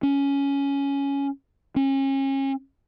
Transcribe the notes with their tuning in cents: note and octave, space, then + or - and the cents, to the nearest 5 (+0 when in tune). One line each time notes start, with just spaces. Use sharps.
C#4 +10
C#4 -35